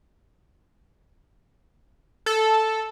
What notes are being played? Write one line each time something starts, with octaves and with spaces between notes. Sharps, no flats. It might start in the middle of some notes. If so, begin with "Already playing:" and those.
A4